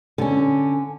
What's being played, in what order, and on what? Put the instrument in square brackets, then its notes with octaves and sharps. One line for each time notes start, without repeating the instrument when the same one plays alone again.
[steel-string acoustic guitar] D3 C#4